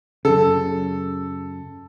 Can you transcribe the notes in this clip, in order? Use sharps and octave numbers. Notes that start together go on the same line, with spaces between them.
F#2 C#3 A4